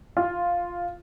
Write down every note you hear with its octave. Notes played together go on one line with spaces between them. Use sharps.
F4